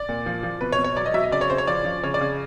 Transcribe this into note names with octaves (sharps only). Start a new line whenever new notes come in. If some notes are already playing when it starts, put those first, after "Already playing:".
Already playing: D5
A#2
F3
F3
B2 B4
C#5
B2
C#5
F#3 D5
D#5
F#3 E5
D#5
C#3 D5
C#5
C#3 C5
C#5
F3 D5
F3
C#3 C#5
D5
C#3